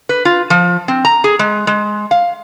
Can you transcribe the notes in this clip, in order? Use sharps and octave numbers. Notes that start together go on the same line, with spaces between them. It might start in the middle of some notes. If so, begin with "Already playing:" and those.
B4
F4
F3
C4
A#5
G#4
G#3
G#3
F5